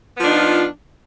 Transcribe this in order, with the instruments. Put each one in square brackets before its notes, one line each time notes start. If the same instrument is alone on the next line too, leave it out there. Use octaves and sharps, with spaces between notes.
[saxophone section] B3
F3
D4
D#4
F4